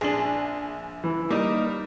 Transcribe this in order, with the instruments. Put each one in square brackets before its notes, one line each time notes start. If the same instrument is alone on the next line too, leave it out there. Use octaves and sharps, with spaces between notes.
[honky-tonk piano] A#1 F#7 [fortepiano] D4 G#4
[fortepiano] E3
[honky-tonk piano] G3 [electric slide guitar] A#3 D#4 A#4